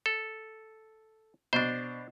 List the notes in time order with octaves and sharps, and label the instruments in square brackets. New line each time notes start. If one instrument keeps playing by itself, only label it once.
[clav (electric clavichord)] A4
[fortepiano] B2 [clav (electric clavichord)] D4 C5